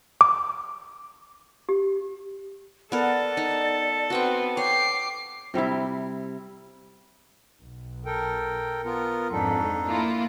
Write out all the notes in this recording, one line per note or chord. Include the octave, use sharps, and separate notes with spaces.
D6
G4
B3 A4 A#4 D5
D#4
B3 C4 F#4 G5 C#6
C#5 G5 D6 C7
C3 G3 C4 E4
B1
A4 A#4 G5
B3 F4 A#4
F2 G#2 D4 D#4 A4
A#3 E4 F4